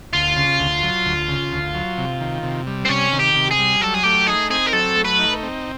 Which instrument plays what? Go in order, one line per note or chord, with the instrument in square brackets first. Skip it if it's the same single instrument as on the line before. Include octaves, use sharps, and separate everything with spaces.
[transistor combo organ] D2 [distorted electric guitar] F4
[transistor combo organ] C#3
D2
F#3
D2
C#3
D2
F#3
C3
D#3
C3
G3
[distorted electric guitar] C4
[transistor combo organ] C3 [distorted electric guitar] C#4
[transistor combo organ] D#3
[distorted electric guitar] G4
[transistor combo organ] C3
[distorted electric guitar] G#4
[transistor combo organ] G3
[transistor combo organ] F#3 [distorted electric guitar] A4
[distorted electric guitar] G#4
[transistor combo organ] A3 [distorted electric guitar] G4
[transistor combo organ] D#4 [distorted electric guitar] G#4
[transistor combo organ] C4 [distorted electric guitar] G#4
[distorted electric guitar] A#4
[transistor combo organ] F#3 [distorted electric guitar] A4
[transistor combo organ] A3
[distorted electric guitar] B4
[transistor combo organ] D#4
C4